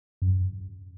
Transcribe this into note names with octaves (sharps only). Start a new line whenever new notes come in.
F#2